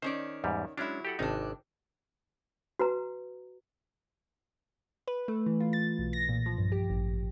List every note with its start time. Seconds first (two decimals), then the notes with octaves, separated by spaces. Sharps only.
0.02 D#3 C#4 C5 D5
0.44 E2 G#2 G3
0.77 F#3 G#3 C#4 D4 E4
1.05 G4 A4 F#5
1.19 G#1 C3 D4 D#4
2.79 F#4 B4 A#5
5.08 B4
5.28 A3
5.46 E3
5.60 F4
5.73 A6
5.99 B1
6.13 A#6
6.29 A#2
6.46 F3
6.58 G2
6.72 G4
6.90 A1